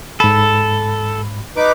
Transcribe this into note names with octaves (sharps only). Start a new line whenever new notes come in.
G#2 A4 B5
D#4 B4 D6